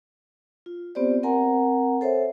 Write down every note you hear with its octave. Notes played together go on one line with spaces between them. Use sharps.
F4
B3 C4 G4 C5 D5
C4 A#4 F#5 G#5 A#5
A4 C5 C#5 E5